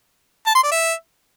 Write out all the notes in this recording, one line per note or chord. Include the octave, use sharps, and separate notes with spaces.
A5
C6
D5
E5